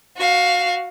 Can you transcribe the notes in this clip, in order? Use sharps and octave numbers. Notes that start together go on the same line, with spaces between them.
F#4 F5